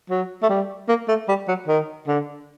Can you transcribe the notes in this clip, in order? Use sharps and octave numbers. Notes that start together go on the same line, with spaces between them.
F#3
A3
G3
A#3
A3
G3
F#3
D#3
D3